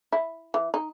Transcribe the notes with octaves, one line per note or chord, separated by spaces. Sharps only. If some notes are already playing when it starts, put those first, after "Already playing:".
E4
E3
D#4